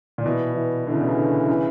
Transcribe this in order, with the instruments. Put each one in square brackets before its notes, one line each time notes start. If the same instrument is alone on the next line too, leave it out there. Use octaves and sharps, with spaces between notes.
[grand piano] A#2
[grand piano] B2 [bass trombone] E3
[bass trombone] E3
[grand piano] D3 [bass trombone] E3
[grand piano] C#3
B2
C#3
D3
C#3